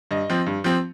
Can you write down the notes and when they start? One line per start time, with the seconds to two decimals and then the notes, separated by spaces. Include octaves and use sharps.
0.11 G2 D#5
0.30 F3 C4
0.46 G2
0.64 F3 C4